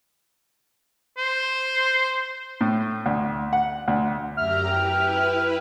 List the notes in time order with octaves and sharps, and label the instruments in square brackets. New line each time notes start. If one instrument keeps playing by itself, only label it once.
[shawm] C5
[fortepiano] A2
D2
F#5
D2
[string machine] F#2 G4 A#5 [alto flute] E5 [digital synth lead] F6
[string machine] E4 B4 [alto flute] G5